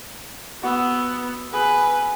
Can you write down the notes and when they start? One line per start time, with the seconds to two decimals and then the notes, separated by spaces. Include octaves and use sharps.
0.63 B3 F#4 E6
1.53 G#4 B4